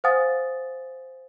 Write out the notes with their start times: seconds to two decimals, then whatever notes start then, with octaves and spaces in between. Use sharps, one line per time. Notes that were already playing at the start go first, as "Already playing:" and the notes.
0.04 C5 F5 F#5 G#5 D#6 A6